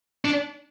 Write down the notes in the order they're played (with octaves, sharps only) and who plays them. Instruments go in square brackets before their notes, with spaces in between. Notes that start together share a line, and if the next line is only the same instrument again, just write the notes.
[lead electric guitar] D4